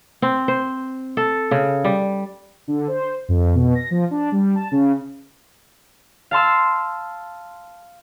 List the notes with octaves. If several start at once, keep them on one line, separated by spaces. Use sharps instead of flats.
C4
C5
A4
C#3
G3
D3
C5
F2
B2
A#6
F3
D4
G3
A5
C#3
F5 A5 C6 E6